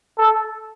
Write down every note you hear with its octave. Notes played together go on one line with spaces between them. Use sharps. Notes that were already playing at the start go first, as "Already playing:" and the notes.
A4